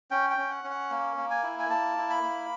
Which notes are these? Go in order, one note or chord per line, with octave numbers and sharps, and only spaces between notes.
C#4 G5
G5
C#4
F#5
C#4
F#5
A#3
A#3
G#5
E4
G#5
A#3 A5
E4
B5
A#3